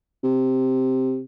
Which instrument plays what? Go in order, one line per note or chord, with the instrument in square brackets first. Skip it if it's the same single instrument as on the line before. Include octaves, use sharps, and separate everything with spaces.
[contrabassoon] C3